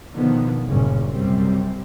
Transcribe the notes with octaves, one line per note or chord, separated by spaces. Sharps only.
B2 D3 D#3 F3 B3
F#1 G2 A#2 C#3 C#4
A#1 F#2 C3 G3 C4